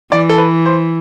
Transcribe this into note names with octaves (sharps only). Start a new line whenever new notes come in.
E3 D5
A4
B4
C5